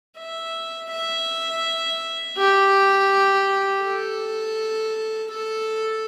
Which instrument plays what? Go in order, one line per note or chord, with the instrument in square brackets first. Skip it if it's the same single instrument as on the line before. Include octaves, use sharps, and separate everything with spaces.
[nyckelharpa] E5
E5
G4
A4
A4